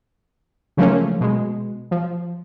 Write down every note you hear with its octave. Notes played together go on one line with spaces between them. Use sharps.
C#3 F3 F#3 A3 A#3 C#4
B2 G#3
F3